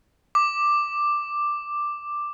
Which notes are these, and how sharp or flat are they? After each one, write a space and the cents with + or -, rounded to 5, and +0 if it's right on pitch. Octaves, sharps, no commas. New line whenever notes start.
D6 +5